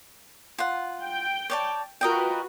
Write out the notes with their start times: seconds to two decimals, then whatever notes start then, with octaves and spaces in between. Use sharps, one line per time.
0.58 F4 F#5
1.03 G5
1.50 C#5 D5 A5
2.01 F4 F#4 A#4 B4 D#5 G5